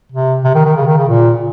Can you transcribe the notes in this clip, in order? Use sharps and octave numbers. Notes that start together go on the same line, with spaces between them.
C3
C3
D#3
D#3
C#3
D#3
C#3
A#2